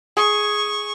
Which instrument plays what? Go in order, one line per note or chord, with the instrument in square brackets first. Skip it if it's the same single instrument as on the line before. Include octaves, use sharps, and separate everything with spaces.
[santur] G#4 [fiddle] C#6